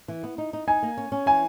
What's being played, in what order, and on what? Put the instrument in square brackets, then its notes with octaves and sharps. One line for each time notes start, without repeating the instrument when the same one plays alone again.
[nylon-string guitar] E3
B3
D#4
D#4
[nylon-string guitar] D#4 [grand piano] G#5
[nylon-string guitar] A#3
C#4
C#4
[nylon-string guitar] E3 [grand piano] G#5